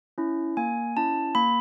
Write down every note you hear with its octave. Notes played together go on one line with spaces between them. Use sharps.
C#4 E4
A#3 G#5
C#4 E4 A5
A#3 B5